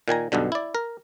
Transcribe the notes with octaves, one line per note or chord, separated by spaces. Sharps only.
A#2 D#3 G#5 A#5
B1 G2 B2 D3
E4 D5
A#4